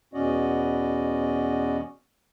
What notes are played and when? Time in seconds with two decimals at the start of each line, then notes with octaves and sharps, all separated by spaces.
0.14 E2 B2 C#4 F#4 D5 D#5